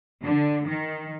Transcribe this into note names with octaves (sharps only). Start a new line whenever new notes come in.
D3
D#3